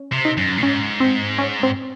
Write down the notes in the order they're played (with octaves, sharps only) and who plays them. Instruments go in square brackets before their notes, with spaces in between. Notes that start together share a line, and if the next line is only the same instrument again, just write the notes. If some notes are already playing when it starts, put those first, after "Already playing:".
Already playing: [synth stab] C#4
[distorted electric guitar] C3
[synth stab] D#4
[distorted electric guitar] F#2
A2
[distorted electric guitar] G#2 [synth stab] C#4
[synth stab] C4
C#4
C4